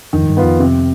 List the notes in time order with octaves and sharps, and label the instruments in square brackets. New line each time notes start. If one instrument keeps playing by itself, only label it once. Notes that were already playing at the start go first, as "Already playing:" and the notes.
[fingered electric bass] F2 [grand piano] D#3
[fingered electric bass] G#2
G2
[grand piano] B3 F4
[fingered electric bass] F2
[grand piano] C3